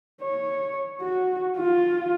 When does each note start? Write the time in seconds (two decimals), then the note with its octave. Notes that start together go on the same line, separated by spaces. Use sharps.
0.22 C#5
1.01 F#4
1.57 F4